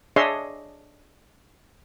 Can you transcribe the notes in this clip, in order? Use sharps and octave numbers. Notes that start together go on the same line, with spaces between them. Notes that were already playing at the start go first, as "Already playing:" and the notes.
D4 G#4 C#5 D#5 E5 C6